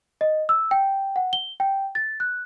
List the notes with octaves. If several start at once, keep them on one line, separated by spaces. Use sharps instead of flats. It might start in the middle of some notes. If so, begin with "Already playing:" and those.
D#5
E6
G5
F#5
G7
G5
A6
F#6